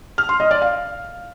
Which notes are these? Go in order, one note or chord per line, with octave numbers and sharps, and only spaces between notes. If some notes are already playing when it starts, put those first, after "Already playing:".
F6
C6
D#5
D5
F5